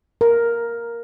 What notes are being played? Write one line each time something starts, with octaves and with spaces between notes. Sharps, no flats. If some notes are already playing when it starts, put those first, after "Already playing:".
A#4